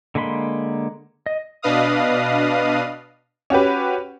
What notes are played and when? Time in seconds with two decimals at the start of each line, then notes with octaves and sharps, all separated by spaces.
0.15 D3 G#3 A#3 B5 C6
1.26 D#5
1.62 B2 D4 B4 D#5 F5 D#6
3.50 C#4 F#4 G4 B4